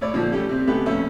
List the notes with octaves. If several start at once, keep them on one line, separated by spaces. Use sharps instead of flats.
A2 C#5 D5
A#2 D3 F3
G3 A3 C#4 G4
C3 C4
C#2 A3 B3 G4
F2 A#2 A3 C#4 E5